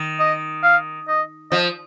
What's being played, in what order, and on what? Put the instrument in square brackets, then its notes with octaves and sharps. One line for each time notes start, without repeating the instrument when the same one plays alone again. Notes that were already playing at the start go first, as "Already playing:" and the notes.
Already playing: [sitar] D#3
[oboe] D#5
F5
D#5
[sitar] F3 [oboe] D#5